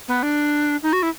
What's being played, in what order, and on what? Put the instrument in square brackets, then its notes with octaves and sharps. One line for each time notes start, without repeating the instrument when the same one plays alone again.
[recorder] B3
D4
D#4
F#4
E4